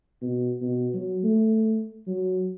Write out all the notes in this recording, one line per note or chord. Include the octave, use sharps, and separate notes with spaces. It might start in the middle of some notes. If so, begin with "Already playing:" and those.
B2
B2
F#3
A3
F#3